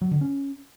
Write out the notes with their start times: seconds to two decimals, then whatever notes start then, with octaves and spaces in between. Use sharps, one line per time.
0.02 F#3
0.11 D3
0.21 C#4